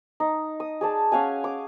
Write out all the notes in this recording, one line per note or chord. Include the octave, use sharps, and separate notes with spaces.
D#4
D#6
G#4 D5 A5
C#4 F5 F#5 G#5
D6